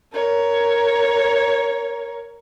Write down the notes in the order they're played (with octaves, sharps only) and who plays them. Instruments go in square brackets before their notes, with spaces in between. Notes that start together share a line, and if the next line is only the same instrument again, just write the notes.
[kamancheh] A#4 C#5